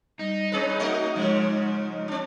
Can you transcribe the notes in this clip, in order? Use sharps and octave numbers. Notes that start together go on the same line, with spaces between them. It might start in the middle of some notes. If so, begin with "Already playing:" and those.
G3 D#4
C4 G#4 B4
A3 F#4 D#5 E5
G#2 C#3 F3 G#3
C4 D4